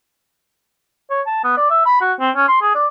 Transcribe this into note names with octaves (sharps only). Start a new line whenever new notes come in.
C#5
A5
B3
D5
E5
B5
F#4
C4
C#4
C6
G#4
D5